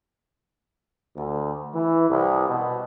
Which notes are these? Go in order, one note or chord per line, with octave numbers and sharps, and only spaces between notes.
D2
E3
C2
B2